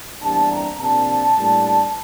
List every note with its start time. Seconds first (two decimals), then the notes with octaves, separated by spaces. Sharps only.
0.21 E2 C3 G3 A#3 D4 A5
0.50 A#5
0.79 C3 F3 A#3 D4 A5
1.37 A2 G3 A#3 D4